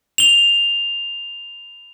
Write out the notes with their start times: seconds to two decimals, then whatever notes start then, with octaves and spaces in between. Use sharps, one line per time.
0.18 F7 G7